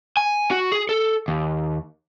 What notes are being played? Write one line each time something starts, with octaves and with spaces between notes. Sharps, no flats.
G#5
F#4
G#4
A4
D#2